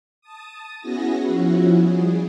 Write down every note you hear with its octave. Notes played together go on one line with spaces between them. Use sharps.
A5 D#6
B3 C#4 E4 F#4 G#4 A#6
F3 C#4 E4 F#4
G3 G#4